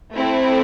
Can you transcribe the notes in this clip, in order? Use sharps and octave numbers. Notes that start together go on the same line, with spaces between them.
A3 C4 E4